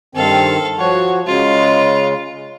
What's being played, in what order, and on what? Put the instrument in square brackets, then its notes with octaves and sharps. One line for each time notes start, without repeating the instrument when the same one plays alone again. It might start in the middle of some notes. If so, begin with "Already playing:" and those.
[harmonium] G2 D#3 C4 [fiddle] A4 F5
[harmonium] F3 F#4 [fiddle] C#5
[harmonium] C#3 G#3 [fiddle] F4